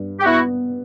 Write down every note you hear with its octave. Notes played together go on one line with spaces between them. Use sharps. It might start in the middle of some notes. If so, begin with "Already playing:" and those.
Already playing: G2
G4
B3 E4 F#4